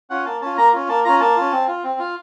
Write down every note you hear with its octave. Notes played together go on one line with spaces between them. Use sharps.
C#4 F4 F#5
A#3 A5
C#4 F4 A5
A#3 A#5
C#4 F4
A#3 A5
C#4 F4 A#5
A#3 A5
C#4 F4
C4
F4
C4
F4